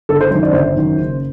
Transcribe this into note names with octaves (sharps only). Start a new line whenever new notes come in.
G1 A4
C5
F#2 D#3 C5
D5
G1 C5
F#2 D#3
F#1